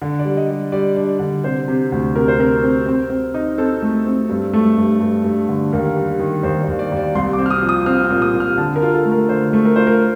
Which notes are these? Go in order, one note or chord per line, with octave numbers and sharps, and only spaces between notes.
D3
D5
G3
D#5
G3
G3 D5
D4
D3
C3 C5
C3
D2
C3 A#4
C5
C4 A#4
C4
C4
C4
D#4
C4 A4
A3
C4
G2
A3
G2
G2
G2
D3
D#2 A#4
G3
D#3
D#2 C5
D5
D#2
D5
D#2
D5
C2 C6
D6
C4
F6
D#6
F3
D#6
C4 F6
F6
A#2
D#6
A#2
F6
D3 A5
A#4
F4
A4
A3
A#4
D3 C5
A3
A#4
F4 C5
A#4